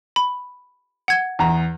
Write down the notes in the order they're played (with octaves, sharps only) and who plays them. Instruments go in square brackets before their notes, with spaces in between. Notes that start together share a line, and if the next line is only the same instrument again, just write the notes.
[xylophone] B5
F#5 G#6
[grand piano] E2 A#5